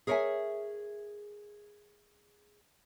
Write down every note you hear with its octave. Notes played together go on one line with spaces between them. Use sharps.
G#4 A#4 C#5 D5 E5 G#5